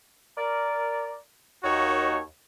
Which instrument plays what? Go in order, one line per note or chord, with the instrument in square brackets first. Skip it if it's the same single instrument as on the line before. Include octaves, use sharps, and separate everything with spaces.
[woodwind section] A#4 D5
[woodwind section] D#2 [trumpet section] D#4 F#4 C#5